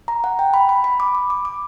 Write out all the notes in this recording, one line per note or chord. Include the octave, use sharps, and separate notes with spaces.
A#5
F#5
G5
B5
B5
B5
D6
D6
D6
D6